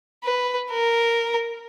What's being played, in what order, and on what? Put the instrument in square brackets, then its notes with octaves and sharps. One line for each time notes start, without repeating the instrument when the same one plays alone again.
[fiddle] B4
A#4